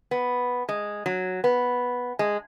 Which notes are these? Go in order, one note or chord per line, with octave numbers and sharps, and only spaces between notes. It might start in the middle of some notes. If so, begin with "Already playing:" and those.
B3
G#3
F#3
B3
G#3